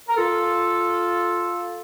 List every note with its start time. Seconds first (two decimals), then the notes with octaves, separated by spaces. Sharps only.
0.08 A#4
0.16 F4 A4